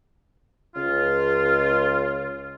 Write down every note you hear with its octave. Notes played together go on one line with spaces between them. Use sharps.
C#2 F4